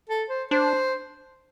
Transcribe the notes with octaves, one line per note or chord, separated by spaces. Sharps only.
A4
C5
D4 C5